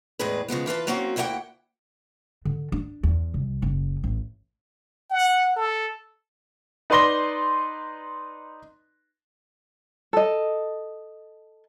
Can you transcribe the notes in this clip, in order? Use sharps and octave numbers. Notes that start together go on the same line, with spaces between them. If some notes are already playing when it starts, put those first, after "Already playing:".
E2 A2 G#3 C4 G#4 B4
C#3 F3 G#3 B3
E3 F4 B4 A5
F#3 A#3 C4 C#4 F4 F#4
D2 A#3 E4 D#5 F#5 G5
D3
D4
E2
C2
F#1
A1
F#5
A4
D#4 B4 D5 C6 A#6 G7
A4 D#5